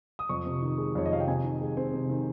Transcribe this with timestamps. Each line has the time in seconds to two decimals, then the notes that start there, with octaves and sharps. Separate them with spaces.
0.19 D#6
0.29 F2 C#6
0.46 C3
0.62 D#3
0.78 G#3
0.95 F2 C#5
1.06 D#5
1.12 C3 F5
1.20 G5
1.27 C3 G#5
1.44 D#3
1.61 G#3
1.77 C4
1.93 C3
2.10 D#3